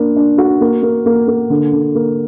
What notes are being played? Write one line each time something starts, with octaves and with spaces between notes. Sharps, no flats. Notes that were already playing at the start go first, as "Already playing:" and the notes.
Already playing: A#3 D4
D4
F#4
A#3
A#3
A#3
A#3
D3
D3
A#3